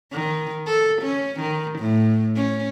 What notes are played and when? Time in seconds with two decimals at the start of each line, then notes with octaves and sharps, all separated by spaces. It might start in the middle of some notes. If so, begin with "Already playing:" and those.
0.12 D#3
0.67 A4
1.02 C#4
1.40 D#3
1.79 A2
2.36 C#4